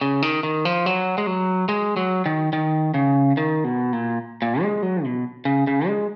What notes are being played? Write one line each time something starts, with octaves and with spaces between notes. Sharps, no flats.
C#3
D#3
D#3
F3
F#3
G#3
F#3
G#3
F#3
D#3
D#3
C#3
D#3
B2
A#2
A#2
G#3
F#3
B2
C#3
C#3
G#3